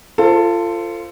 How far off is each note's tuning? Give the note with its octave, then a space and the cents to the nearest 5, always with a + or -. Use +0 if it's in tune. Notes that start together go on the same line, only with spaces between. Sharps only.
F4 -20 A4 +20 C5 +0